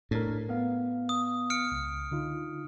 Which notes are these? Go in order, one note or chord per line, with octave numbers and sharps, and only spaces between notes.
A2 D4 A#4
B3 F5
D#6
F6 C#7 D7
C#2
D3 D#4 F4